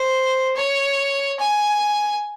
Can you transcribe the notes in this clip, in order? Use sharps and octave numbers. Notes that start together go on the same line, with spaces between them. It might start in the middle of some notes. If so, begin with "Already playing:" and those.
Already playing: C5
C#5
G#5